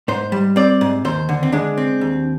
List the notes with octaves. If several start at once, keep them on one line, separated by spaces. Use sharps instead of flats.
G#2 C5
G3
C4 D5
G#2
D#2 C5
D3
C4
G#3 D4
C4
D#2